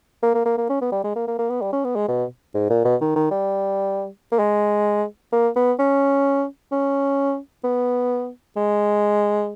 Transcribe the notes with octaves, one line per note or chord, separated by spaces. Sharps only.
A#3
A#3
A#3
A#3
C#4
B3
G3
G#3
A#3
A#3
A#3
B3
G3
C#4
B3
G#3
B2
G#2
A#2
B2
D#3
D#3
G3
A#3
G#3
A#3
B3
C#4
C#4
B3
G#3